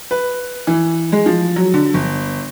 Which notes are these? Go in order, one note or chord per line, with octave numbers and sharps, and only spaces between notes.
B4
E3
G#3
F3
F#3
D3
G1